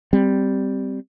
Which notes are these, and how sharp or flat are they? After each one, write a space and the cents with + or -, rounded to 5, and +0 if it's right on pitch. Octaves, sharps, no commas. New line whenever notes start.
G3 +0 C4 -15